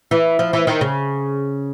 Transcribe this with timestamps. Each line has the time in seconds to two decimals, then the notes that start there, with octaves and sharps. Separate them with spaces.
0.11 E3
0.39 F3
0.53 E3
0.67 D#3
0.81 C#3